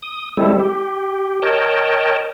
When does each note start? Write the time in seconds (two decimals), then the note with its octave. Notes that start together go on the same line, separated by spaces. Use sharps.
0.02 D#6
0.37 G3 G#3 C4 E4 A4
0.59 G4
1.42 A#4 C#5 D#5 G5 A5